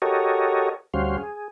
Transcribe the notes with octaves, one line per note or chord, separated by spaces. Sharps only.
F#4 G4 A4 A#4 C#5 D#5
D2 G3 C#4 F#4 C5 F5
G#4